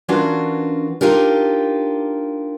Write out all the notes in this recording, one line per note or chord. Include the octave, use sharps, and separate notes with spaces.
E3 C#4 D4 F4 F#4 A#4
D4 D#4 F4 G4 A#4